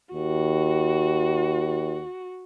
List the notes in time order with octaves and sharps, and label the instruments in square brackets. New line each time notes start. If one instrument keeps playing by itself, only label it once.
[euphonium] D#2 [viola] F#4